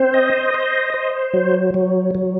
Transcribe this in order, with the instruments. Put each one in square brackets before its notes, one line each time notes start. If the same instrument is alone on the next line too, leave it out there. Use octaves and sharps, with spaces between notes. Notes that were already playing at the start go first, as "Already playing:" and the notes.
Already playing: [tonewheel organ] C4 C5
D#5
C5
C5
F#3
F#3
F#3